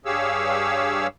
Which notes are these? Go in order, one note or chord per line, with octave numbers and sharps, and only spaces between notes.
G2 G4 G#4 C#5 F5 E6